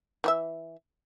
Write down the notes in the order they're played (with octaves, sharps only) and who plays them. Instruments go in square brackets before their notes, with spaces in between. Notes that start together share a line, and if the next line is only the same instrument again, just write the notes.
[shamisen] E3 G4 E5